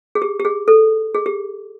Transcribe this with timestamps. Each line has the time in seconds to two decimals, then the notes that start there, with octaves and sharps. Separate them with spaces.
0.15 G#4
0.22 G4
0.40 G4
0.45 G#4
0.68 A4
1.15 G#4
1.26 G4